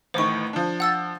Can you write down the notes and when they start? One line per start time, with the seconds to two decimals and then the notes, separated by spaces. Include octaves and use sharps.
0.14 A1 A2 D#3 C5 C#6
0.53 F3 D4
0.80 F#5 E6 A6